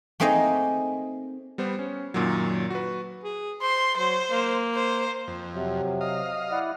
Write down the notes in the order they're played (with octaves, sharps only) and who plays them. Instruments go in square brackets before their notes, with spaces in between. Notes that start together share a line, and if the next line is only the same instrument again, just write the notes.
[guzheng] A3 A#3 C4 D#4 G#4 D#5
[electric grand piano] G3 B3 C5
C#4
F#2 A#2 D#3 F#3
F#4 B4
[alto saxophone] G#4
[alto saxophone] C5 [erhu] C6
[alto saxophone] F#3 [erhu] C5
[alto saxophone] A#3
[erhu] C5
[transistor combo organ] F2
[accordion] C3 F#3
[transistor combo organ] D#5 F5
[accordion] E4 D5 F#5